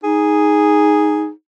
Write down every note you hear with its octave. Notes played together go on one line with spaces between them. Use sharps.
D#4 G#4